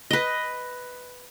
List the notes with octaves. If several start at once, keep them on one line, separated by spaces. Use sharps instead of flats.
B4 D#5